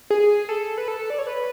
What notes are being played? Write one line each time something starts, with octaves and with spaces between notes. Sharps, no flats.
G#4
A4
B4
A4
D5
C#5
B4